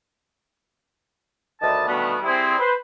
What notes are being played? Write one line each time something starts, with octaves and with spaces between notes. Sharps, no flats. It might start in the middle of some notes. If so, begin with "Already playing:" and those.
D2 D#3 G3 D#5 A5
B2 D3 D#3 G3 A3 B3
G3 C4 E4 G#4
B4 C5